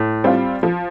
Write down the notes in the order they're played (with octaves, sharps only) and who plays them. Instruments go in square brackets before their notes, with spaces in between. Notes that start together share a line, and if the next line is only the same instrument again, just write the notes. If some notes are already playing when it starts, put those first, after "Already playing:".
Already playing: [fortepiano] A2
[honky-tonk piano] G3 C4 F4
F3